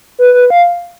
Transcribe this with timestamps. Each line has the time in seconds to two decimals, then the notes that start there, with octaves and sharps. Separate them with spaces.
0.19 B4
0.34 B4
0.50 F5